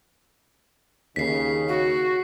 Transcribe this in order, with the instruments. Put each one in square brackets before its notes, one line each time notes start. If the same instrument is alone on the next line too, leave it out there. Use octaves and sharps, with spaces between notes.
[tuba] D#2 [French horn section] C#3 [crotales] B6 C7
[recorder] F#4